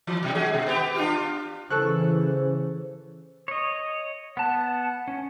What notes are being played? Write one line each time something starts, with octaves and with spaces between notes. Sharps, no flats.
E3
B2 F#3
G#3 F#4 G#4
B2
B3 G4
D4 F4 G4
C#3 E3 A4 C5 C#6 F#6
C#5 D#5
B3 F#5 A5
C#4